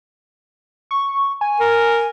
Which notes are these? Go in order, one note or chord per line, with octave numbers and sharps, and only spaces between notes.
C#6
G#5
A#4